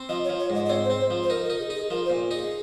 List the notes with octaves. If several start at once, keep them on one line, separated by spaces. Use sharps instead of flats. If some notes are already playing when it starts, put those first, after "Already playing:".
Already playing: C4
F3 D#5
C#5
F3
C#5
G#2 D#5
D#5
C4 C#5
C5
C4
C5
F3
C5
D#4 A#4
A#4
D#4
G#4
D#4
G#4
F3 A#4
C5
A#2
D#4 G#4